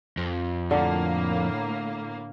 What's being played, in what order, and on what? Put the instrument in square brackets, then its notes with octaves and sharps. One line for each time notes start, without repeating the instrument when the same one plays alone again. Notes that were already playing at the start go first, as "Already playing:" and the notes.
[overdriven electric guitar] F2
[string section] A2 A#3 [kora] D3